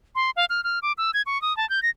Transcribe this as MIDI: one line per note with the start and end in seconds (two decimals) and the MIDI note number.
0.15 0.30 84
0.36 0.45 77
0.50 0.63 89
0.64 0.79 89
0.82 0.92 86
0.98 1.11 88
1.14 1.22 92
1.26 1.40 85
1.42 1.56 87
1.57 1.68 81
1.70 1.82 91
1.83 1.90 94